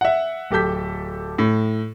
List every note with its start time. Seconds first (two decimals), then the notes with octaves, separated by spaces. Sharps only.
0.01 E5 F#5
0.51 D1 G4 A4 G6 B6
1.38 A2